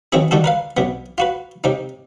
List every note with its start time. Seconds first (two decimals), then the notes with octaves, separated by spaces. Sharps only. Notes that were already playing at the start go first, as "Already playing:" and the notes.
0.12 D#3 E3 F#3 C4 C#4 G#4
0.31 D3 D#3 G3 F#4 A4
0.44 A#4 B4 F5
0.77 B1 B3
1.18 F4 F#4 B4
1.64 C3 C4 D#4